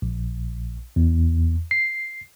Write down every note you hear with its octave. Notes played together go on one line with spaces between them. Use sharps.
A#1
E2
C7